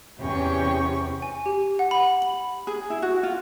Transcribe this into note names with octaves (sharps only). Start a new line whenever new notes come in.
E2 C3 C#4 G4 G5 C#6
G#5
G4
F#5
B5
F#7
G#4
E4
F#4
F4